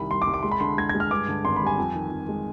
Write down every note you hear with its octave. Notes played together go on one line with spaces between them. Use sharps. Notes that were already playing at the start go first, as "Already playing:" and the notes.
Already playing: C2 D#3 G3 B5
G3 C6
D6
C2
D6
G#3 C6
B5
D3 C6
G#3 G#6
G#6
G#3
F6
G2 D6
D3
G#1 C6
B5
G3
G#5
F2
D#3
F2
G#3